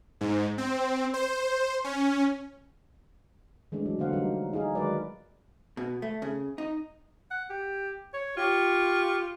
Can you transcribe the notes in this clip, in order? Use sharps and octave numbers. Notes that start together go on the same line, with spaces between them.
G#2
C4
C5
C#4
E3 G#3 A3 D4
F#3
D3 A#3 C5 F5 F#5
F#3 G3 A3 D#4
D#4 E4 G#4 F5
D#3 F#3 G#3 A#4 B4 D5
B2
A3
C#3
D#4
F#5
G4
C#5
F4 G4 C#6